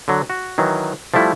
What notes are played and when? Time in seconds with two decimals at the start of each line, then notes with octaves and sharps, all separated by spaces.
0.08 D3 F#3
0.30 F#4
0.58 D#3 E3 F#3
1.14 F3 G3 A3 E4